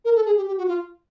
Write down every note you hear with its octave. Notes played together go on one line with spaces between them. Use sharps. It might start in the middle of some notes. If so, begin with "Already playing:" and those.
A#4
A4
G#4
G4
G4
F#4
F4